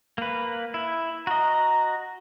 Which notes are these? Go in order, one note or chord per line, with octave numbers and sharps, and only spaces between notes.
A#3 B4
E4
F#4 D#5 A#5